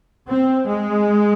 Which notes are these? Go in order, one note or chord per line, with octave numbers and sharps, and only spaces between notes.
C4
G#3